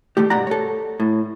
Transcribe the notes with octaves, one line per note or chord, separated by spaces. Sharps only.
D#2 G3 A3 G4
G2 B2 G4 D5 F#5 A#5
A4 C#5
A2